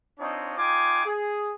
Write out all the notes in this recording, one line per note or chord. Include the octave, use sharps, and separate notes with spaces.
C4 D4 D#4 F4 C#5 D#5
D#4 F4 G5 G#5 D6
G#4